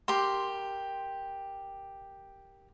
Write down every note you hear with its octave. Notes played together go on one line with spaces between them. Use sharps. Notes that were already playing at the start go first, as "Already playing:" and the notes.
G4 A#4 C6